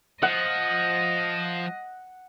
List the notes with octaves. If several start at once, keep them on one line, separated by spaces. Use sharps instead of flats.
F3 D#5 F#5